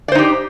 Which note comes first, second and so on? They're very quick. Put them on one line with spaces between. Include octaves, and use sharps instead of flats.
D5 C5 D#4 G4